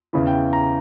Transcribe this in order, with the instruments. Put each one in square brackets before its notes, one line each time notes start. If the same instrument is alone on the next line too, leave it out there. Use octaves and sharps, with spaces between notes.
[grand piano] E2 C#3 E3 B5
G5
A#5